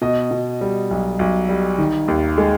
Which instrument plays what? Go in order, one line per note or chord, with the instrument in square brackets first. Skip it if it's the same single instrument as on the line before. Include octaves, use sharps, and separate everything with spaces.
[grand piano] B2 D#5
B2
G3
B1
B1
G3
D#3
D#2
G#3